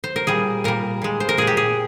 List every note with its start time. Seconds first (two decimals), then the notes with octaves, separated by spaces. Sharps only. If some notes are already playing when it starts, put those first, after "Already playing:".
0.04 C5
0.16 A#4
0.27 A#2 G3 G#4
0.64 A#2 G3 A#4
1.02 A#2 G#3
1.20 C5
1.29 A#4
1.37 A#2 G#3 G#4
1.47 G4
1.57 G#4